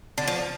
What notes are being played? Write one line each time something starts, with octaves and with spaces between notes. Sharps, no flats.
D3
F3